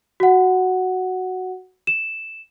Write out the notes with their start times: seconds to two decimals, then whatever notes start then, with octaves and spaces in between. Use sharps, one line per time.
0.20 F#4 F#5
1.87 E7